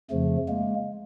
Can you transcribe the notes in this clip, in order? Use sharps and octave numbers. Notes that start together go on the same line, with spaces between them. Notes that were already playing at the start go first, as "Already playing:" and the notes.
F2 C#3 F3 A3
G#3 A#3